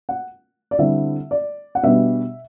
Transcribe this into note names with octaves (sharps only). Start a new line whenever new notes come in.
F#5
D5
D3 G3 C4 E4 E5
D5
F#5
B2 G3 B3 D4 E5